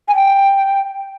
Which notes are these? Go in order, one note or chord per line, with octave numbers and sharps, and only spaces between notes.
G#5
G5